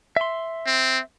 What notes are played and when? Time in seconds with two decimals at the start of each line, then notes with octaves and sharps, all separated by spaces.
0.17 E5 C6
0.67 C4